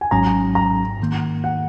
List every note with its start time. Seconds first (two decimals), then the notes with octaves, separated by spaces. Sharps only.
0.01 G#5
0.11 G#1 G#2 F#3 C#4 A#5
0.55 A#5
1.00 G#2 D#3 A#3
1.44 F#5